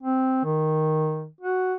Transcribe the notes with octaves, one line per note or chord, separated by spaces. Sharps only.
C4
D#3
F#4